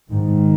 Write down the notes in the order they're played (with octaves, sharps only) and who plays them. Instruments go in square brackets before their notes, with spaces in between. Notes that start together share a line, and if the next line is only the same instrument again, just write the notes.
[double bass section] G#2 D#3